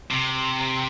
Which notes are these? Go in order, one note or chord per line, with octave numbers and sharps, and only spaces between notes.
C3